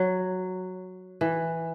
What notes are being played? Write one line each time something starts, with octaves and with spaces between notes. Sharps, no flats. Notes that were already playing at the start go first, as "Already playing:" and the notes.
Already playing: F#3
E3